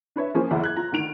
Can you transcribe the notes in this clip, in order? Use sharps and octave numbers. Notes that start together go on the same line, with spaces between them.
D4 B4 C#5 E5
F3 A#3 C#4 G#4 C5
F#1 E2 E4
F#6 G#6
F4 A#5
D2 D#3 D7 F7